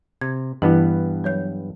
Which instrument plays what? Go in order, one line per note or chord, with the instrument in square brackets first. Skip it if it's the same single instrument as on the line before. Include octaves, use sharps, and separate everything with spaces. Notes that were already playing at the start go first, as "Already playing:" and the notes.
[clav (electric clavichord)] C3 [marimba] G#6
[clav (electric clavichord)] G2 B3 [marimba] E3 E4
[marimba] F#3 C#5 G6